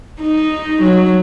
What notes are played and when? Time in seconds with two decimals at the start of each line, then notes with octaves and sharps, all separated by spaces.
0.21 D#4
0.82 F#3